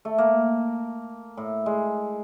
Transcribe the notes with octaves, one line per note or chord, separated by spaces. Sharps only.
A3
A#3
A2
G#3